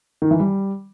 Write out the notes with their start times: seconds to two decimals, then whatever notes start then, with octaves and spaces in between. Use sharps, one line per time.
0.22 D#3
0.31 E3
0.40 G3